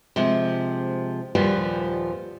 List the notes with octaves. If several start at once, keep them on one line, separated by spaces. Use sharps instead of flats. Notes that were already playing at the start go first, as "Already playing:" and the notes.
C3 F3 G#3
D#2 A#2 F3 G3 B3